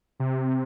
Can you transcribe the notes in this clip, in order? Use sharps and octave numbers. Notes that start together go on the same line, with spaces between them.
C3